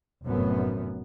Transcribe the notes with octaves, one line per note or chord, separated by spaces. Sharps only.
F1 F#2 A2 B3